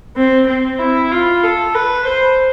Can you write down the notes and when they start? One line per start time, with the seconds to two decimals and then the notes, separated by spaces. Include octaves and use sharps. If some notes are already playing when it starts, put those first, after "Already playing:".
0.17 C4
0.47 C4
0.79 E4
1.12 F4
1.43 A4
1.75 B4
2.06 C5